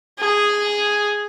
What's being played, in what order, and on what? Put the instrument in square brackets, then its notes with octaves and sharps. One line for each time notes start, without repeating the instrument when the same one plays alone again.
[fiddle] G#4